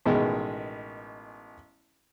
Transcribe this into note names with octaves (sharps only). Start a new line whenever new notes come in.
A1 B2 D#3 G#3